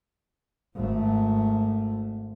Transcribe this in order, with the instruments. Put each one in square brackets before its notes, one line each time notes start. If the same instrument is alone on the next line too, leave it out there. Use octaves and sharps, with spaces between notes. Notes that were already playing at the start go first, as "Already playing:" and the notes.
[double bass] G#1 A3